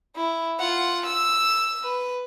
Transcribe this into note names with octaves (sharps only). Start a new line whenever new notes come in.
E4
F4 F#5
E6
B4